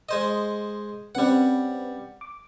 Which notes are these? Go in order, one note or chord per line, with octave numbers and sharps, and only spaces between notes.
G#3 C5 D#5
G3 C4 C#4 B4 F#5
D6